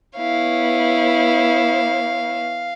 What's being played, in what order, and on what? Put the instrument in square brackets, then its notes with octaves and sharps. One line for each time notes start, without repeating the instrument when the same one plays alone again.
[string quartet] B3 E4 C#5 [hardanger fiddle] F5